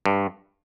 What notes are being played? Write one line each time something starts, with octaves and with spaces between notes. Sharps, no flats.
G2